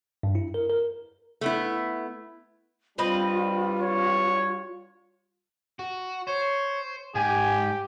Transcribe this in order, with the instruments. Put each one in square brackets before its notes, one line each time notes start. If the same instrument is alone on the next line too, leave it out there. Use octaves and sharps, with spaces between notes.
[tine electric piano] G2
E4
A#4
A#4
[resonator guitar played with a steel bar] A3 B3 E4
[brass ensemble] G3 D4 [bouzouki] C4 B4 D#5 [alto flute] F4
[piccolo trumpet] C#5
[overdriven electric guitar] F#4
[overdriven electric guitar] C5 [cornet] C#5
[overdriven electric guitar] G#2 [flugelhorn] G4 [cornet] G#5